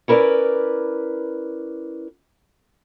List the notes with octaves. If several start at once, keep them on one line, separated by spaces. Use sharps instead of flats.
C#4 E4 A#4 B4 D5